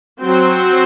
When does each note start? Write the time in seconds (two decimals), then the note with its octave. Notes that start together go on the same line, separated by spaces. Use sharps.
0.23 F#3 C4 F#4 C5